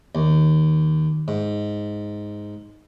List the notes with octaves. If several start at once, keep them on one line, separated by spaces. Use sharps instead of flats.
D#2
G#2